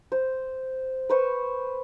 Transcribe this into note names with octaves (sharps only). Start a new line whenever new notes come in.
C5
B4 C5 C#6